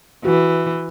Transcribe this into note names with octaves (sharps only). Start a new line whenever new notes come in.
E3 F#4